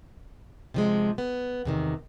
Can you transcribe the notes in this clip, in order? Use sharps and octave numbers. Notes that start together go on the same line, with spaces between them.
C3 F3 G#3
B3
E2 C3 D#3